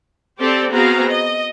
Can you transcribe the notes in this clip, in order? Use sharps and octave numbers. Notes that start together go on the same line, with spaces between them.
C4 G4 A4 C5 D5
B3 C4 F#4 G#4 F5 A#5
D#5